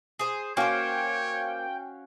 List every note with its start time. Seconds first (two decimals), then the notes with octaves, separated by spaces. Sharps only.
0.19 G#4 C5
0.57 A#3 C#4 F#4 C5 C#5 F5 G5